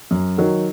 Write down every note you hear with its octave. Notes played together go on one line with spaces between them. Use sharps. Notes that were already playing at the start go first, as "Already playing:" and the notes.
F#2
D#3 F#3